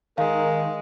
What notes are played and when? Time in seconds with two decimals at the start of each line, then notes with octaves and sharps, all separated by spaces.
0.18 D#3 G#3 A#4 F5